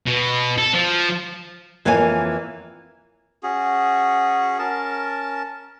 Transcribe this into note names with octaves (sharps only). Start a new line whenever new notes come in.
B2
A4
F3
F2 E3 A#3 C#5 F5 G#5
C#4 F#4 G#4
C#4 A#4 A5